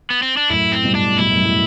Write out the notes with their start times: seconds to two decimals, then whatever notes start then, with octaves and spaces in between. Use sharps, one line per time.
0.10 B3
0.23 C4
0.37 D4
0.50 F#2 A2 E4
0.72 C4
0.84 G2 B2
0.95 D4
1.18 G2 B2 E4
1.30 F#2
1.38 G2
1.45 A2